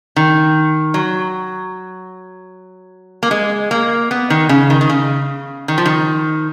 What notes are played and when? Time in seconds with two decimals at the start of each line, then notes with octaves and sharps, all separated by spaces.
0.16 D#3
0.94 F#3
3.23 A#3
3.31 G#3
3.71 A#3
4.11 B3
4.30 D#3
4.49 C#3
4.70 D#3
4.81 D#3
4.89 C#3
5.68 D#3
5.78 F3
5.86 D#3